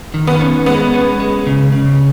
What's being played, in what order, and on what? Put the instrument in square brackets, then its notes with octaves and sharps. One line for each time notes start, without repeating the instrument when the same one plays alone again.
[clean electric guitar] D#3
[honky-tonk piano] B3
[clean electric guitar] C#4
[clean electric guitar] G#3 [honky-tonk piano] B3
[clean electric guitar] C#4
G#3
C#3
C#3